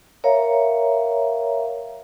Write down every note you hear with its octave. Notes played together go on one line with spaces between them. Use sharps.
A#4 C#5 E5 F5 A#5